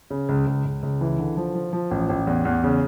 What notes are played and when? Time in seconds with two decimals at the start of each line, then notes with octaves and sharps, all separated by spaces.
0.10 C#3
0.29 C#2
0.47 C#2
0.65 C#2
0.83 C#2
1.01 E3
1.19 D3
1.37 F3
1.55 F3
1.73 F3
1.91 A1
2.09 A1
2.27 E2
2.45 E2
2.64 C#3